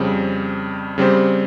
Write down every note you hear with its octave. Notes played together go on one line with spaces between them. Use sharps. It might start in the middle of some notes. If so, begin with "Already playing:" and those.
Already playing: F2 C#3 G3 C4
C#3 G3 C4 G4 C5